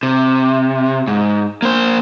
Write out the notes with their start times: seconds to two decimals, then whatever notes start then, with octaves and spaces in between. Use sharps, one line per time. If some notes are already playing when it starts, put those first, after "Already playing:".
0.03 C3
1.08 G#2
1.62 A#3 C5